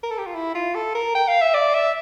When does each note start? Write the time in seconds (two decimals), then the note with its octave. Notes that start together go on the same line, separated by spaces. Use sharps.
0.03 A#4
0.11 A4
0.18 G4
0.26 F4
0.35 E4
0.55 F4
0.75 A4
0.95 A#4
1.15 G5
1.28 F5
1.41 E5
1.54 D5
1.74 E5